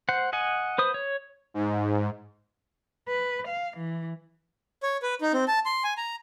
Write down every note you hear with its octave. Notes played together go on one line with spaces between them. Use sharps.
C5 F#5
D#5 F#5 G#5
B4 C5 D#6
C#5
G#2
B4
F5
E3
C#5
B4
D#4
C4
A5
C6
G#5
A#5